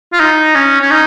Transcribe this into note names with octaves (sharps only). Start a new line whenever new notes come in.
F4
D#4
C#4
C#4
D#4